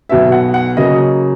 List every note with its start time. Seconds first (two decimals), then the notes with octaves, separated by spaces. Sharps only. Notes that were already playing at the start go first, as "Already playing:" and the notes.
0.09 B1 B2 F#3 B3 E5
0.32 F#5
0.54 F#5
0.77 C#3 F#3 A#3 D#5